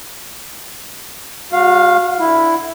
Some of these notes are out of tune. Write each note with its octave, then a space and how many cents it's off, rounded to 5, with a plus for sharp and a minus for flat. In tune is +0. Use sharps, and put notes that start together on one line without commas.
G3 +35 F#4 -35 F5 +0
D3 +0 E4 +0